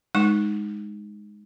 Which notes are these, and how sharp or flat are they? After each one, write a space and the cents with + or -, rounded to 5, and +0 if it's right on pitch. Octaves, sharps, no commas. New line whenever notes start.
G#3 +0 D#4 +0 C#6 +0